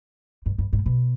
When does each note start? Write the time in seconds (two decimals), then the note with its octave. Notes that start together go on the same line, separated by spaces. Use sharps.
0.46 G2
0.58 G2
0.73 G#2
0.86 B2